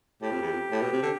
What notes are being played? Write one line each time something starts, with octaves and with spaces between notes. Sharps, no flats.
A2 G4
F2
E2
F2
A2
B2
C3
D3